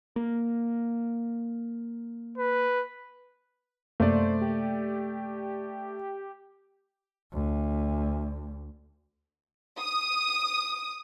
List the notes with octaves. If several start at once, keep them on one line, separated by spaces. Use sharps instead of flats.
A#3
B4
F#2 C3 A3 A#3 C5 D5
G4
D2
D#6